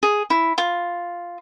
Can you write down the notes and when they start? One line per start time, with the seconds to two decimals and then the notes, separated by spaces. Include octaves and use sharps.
0.03 G#4
0.30 E4
0.58 F4